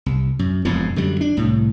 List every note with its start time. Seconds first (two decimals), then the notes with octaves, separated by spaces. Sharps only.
0.06 C2
0.39 F#2
0.65 E1 F2 G#2 C#3
0.96 F#2 D3 G3
1.21 D4
1.37 C2 A2